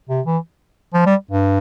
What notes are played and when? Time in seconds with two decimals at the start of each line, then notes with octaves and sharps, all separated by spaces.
0.09 C3
0.26 E3
0.93 F3
1.06 G3
1.31 G2